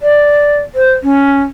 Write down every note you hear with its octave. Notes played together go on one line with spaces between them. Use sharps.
D5
C5
C#4